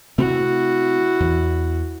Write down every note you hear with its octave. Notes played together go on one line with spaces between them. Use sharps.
C3 A3 C4 E4 F#4
E2